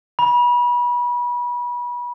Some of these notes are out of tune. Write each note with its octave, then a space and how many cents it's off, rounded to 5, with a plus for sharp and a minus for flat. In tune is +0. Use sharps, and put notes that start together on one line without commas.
B5 -30